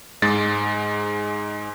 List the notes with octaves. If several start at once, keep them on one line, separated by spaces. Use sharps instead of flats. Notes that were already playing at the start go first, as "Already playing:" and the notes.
G#2 G#3 A6